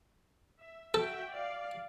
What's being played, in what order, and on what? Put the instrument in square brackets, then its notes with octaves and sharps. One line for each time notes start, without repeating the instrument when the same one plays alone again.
[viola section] E5
[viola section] F#4 E5 G5 [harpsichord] A4
[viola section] D5 F5